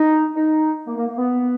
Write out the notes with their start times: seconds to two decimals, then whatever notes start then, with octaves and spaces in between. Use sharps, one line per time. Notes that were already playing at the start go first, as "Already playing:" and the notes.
Already playing: D#4
0.36 D#4
0.87 A#3
0.97 A#3
1.08 A#3
1.18 B3